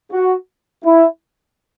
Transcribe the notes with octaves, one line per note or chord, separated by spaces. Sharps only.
F#4
E4